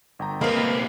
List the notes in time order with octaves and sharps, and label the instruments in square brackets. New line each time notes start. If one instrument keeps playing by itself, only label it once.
[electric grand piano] G1 G5 A#5
[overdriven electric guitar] C#2 C4 [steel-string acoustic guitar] A#3 B4 [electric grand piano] A#4 D#5 B5